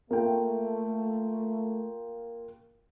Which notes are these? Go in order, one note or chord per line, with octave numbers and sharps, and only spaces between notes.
A3 A#3 F4 G5